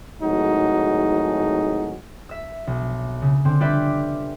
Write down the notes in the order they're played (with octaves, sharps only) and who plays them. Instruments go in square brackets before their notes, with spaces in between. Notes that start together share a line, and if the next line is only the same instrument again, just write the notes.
[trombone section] G#1 A2 F#3 D#4 F#4 G#4
[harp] E5 E6
B1
C#3
D3 C4
G3 F4 G4 B4 D5 E5